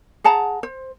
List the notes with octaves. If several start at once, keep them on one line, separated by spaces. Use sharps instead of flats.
G#4 F#5 A5 A#5
C5